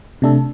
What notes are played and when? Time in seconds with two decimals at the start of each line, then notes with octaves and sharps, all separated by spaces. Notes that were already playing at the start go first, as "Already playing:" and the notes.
0.22 C3 A3 D4 A4